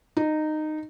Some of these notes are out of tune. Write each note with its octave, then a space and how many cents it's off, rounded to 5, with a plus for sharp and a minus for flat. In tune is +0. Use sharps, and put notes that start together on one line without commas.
D#4 -15